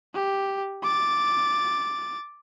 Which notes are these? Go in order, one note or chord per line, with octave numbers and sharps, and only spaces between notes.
G4
D6 A6